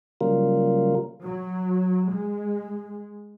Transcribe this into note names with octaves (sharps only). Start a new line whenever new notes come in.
C#3 F#3 G3 A#3 F4 A#4
F#3
G#3